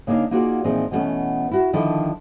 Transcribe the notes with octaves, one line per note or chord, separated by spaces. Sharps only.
C#3 A#3 D4 D#4 F5
A#3 D#4 F4 F#4 G#4 D5
A#2 E3 F3 C4 D#4 G#4
B2 E3 G3 A3 B3 C#4
E4 F#4
D3 D#3 F3 D4 E4 A4